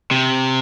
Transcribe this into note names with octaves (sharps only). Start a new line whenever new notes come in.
C3